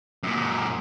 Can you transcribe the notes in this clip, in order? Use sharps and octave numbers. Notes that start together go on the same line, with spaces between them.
F#2 A#2